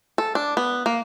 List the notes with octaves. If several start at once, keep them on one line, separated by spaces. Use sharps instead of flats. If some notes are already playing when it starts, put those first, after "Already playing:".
A4
D4
B3
A#3